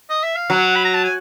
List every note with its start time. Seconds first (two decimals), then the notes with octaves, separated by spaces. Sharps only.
0.10 D#5
0.23 E5
0.36 F5
0.50 F#3 F#5
0.76 B5
0.85 A#5
0.94 A5
1.04 G#5